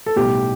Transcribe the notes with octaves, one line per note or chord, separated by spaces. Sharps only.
A4
B1 A2 G3 G4